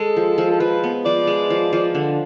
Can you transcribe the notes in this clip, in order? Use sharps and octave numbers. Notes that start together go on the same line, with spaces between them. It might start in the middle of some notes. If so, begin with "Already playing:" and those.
Already playing: G#3 A4
F3
F3
A4
F3 B4
B3
F3 D5
G#3
F3
F3
D3